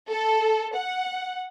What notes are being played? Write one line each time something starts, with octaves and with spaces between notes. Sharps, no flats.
A4
F#5